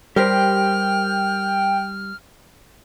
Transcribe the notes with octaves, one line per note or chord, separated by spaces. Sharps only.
G3 G4 A#4 C5 G5 F6